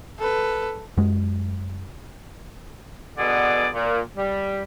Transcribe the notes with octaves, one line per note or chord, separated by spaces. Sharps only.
A4 B4
F#2 G#3
B2 D3 B3 G#4 D5
A#2
G3